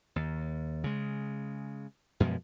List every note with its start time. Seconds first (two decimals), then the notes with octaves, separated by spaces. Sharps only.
0.16 D#2
0.84 C#3 G#3
2.20 F#2 B2 F3 G#3